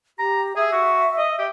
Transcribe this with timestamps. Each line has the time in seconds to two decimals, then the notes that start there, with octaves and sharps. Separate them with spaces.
0.19 G4 A#5
0.56 G#4 E5
0.72 F#4
1.18 D#5
1.39 G4